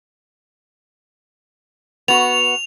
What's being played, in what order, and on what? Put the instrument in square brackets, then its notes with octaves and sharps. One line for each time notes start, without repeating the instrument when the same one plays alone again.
[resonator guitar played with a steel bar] B3 F#4 [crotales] F7